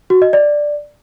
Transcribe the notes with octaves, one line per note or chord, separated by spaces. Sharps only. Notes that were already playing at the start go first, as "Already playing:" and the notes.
F#4
D#5
D5